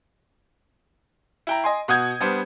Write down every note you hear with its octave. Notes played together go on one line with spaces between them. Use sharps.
E4 G5 A#5
D#5 G#5 C6
B2 F#5 D#6 G6 G#6
G3 B3 D4 C5